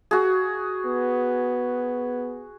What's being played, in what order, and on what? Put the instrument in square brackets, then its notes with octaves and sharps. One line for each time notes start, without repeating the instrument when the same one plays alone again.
[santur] F#4 G#4
[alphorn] B3